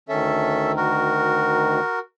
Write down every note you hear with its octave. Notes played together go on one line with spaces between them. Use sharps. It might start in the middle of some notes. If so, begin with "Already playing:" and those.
D2 D#3 C#4 A4 E5
F#4 A#4